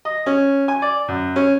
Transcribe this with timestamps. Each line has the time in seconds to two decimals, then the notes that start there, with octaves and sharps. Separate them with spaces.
0.05 D#5
0.26 C#4
0.68 G#5
0.82 D5
1.08 F#2
1.36 C#4